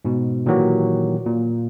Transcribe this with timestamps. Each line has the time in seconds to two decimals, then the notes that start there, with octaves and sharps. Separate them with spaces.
0.05 G#2 B2
0.46 A#2 D#3 E3 F#3 F#4 G4
1.26 A#2